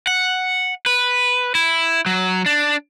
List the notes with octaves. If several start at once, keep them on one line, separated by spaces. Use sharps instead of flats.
F#5
B4
E4
F#3
D4